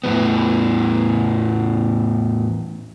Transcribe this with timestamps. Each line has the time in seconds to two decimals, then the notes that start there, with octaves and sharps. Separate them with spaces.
0.04 E2 A2 E3 B3